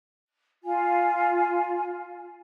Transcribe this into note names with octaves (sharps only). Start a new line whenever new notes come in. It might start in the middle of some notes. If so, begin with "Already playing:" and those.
F4 G#5